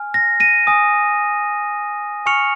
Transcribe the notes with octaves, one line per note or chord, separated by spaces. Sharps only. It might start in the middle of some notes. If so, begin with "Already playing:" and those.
Already playing: G#5 F6
A#6
A#6 D#7
G#5 D#6
G#5 C#6 F6 C#7 F7